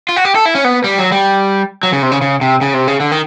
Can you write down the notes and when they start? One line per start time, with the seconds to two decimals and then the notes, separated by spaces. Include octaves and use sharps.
0.09 F4
0.16 F#4
0.25 G4
0.35 A4
0.45 E4
0.55 C#4
0.64 B3
0.84 G3
0.98 F#3
1.12 G3
1.83 F#3
1.92 C#3
2.02 C3
2.11 C#3
2.21 C#3
2.41 C3
2.61 C#3
2.74 C3
2.87 C#3
3.00 D3
3.12 D#3